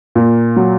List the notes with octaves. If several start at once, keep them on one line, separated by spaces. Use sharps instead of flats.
A#2
F#3